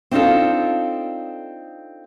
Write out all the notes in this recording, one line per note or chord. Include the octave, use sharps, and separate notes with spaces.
C4 D4 D#4 F4 A4